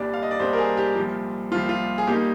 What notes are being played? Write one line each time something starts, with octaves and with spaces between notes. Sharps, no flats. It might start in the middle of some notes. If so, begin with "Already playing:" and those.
Already playing: C2 A#2 G3 D4 D5
F5
D#5
D5
C2 A#2 G3 D4 C5
A#4
G#4
G4
C2 A#2 F3
C2 A#2 F3 F4
F4
G#4
A#2 G3 A#3 D#4 G4